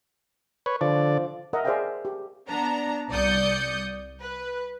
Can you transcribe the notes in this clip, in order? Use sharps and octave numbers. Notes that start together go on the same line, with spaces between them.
B4 C#5
D3 F3 D5
A#4 D#5 E5 F#5
G#4 C5 D5 E5 F5 G5
G4
B3 D4 A#5
C2 D5 D#6 G6 C#7
B4